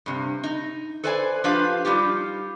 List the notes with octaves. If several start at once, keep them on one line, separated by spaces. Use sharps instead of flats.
G2 C3
D#4
A4 B4 C5 D5 F#5 G#5
F3 D4 F4 G4 B4 F5
G3 D#4 F4 G4